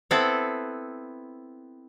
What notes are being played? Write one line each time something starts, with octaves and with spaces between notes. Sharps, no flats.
B3 C4 E4 A4 B4